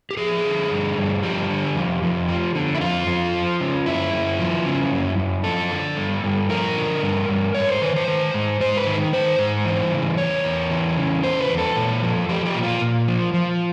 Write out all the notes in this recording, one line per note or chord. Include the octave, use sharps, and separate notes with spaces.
G4
F3 G#4
D3
G2
G2
F3 G4
D3
F2
F2
F3
D3
E4
F2 F4
F2
F3
C#3
F#2 E4
F#2
F3
C#3
F#2
F#2
F3 A4
D3
G2
G2
F3 A#4
D3
G2
G2
G#2 C#5
C5
D#3 B4
C5
D#3
G#2
G#2 C5
B4
D#3
D#3 C5
G#2
E3
C#3
E2 C#5
E2
E3
C#3
E2 C5
B4
E2
A4
A#2
F3
F3 G4
G4
A#2
F4
A#2
F3
F3